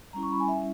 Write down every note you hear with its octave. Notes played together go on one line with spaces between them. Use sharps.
G3 C#4 E4 A#5
C#6
B5
G#5
E5